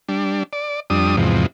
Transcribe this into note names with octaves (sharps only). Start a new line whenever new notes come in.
G3 D4
D5
F2 G3 D4 D#6
E2 G#2 C3 F3